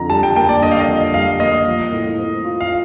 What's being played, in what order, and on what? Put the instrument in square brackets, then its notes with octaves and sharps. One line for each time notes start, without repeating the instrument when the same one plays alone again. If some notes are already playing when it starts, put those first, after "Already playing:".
Already playing: [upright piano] F2 D3 [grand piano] A#5
[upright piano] G3 [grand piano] A5
[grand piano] G5
[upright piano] A#3 [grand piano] G5
[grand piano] D5
[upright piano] D3 [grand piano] D#5
[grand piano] F5
D#5
[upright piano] F2
[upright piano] G3 [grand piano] F5
[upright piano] A#3 [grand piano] D#5
[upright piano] F3
A2
C4
F4
[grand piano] F5